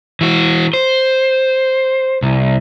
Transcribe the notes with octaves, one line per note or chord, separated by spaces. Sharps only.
E3 F#4
C5
C2